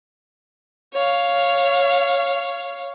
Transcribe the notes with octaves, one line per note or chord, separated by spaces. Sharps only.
C#5 F5